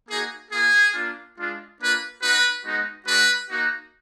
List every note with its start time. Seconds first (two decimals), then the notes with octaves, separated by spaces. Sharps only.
0.09 A#3 D#4 F#4 G#4
0.51 A#3 F4 G#4
0.93 A#3 D4 F4
1.37 G#3 D4 F4
1.79 A#3 D4 F4 B4
2.21 B3 D#4 F#4 B4
2.64 G#3 B3 D#4 F#4
3.06 G#3 D4 F#4 B4
3.49 A#3 D#4 F#4